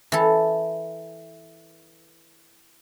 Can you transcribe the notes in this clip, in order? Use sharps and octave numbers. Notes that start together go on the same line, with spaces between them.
E3 A4